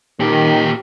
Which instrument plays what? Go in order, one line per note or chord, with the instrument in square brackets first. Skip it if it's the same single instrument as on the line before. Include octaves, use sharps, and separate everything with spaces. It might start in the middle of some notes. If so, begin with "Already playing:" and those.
[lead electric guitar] A#2 G4 [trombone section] D#3